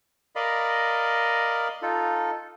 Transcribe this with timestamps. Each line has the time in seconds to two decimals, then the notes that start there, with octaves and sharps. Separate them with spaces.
0.36 A#4 D5 D#5 F5 B5
1.82 D#4 F4 A4